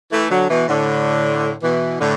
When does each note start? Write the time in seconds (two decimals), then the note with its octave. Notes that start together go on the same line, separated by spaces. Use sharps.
0.12 E3 A3
0.30 D3 F#3
0.49 B2 E3
0.68 A2 D3
1.62 B2 E3
2.00 A2 D3